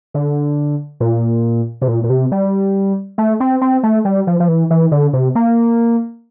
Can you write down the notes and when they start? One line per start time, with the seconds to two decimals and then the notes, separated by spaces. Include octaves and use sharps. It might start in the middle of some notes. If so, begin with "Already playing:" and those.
0.14 D3
1.00 A#2
1.82 C3
1.88 A#2
2.04 A#2
2.10 C3
2.32 G3
3.18 A3
3.40 C4
3.61 C4
3.83 A3
4.05 G3
4.27 F3
4.40 F3
4.48 E3
4.70 E3
4.91 D3
5.13 C3
5.35 A#3